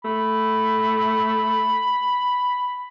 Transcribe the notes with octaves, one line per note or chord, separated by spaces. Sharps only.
A3 B5